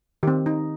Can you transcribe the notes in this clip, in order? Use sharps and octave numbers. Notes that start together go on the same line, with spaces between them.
D#3 C4 G4
D#4